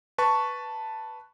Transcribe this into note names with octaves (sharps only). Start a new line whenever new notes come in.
B4 A5 C#6